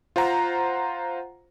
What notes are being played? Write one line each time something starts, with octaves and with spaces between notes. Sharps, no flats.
F4 C5 F#5 A#5